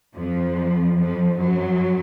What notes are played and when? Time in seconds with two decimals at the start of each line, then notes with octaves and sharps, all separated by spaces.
0.15 F2 F3
0.98 F2 F3
1.38 F#2 F#3